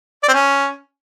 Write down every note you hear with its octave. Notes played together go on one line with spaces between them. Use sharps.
D5
C4
C#4